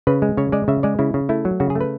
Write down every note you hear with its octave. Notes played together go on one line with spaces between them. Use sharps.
C#3 B4
G#3
C#3 C#5
G#3 D5
C#3 E5
G#3 D5
C#3 E4
C#3
A3 E4
F#3
C#3 F#4
G#4
A3
B4